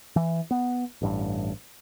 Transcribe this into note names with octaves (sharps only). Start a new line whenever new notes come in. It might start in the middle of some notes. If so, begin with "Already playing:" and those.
E3
B3
A1 G2